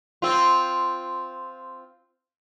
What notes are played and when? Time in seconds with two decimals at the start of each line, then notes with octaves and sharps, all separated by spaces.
0.22 C4 F4